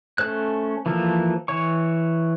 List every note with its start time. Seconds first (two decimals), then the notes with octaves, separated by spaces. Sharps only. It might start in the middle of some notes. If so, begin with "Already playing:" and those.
0.18 A3 C#4 A4 C5 F#6
0.86 E3 F3 A#3 A4
1.48 E3 C#5 C#6